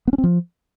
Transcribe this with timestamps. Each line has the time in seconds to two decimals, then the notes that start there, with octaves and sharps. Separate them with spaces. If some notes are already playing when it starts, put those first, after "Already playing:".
0.08 B3
0.13 C#4
0.18 C4
0.24 F3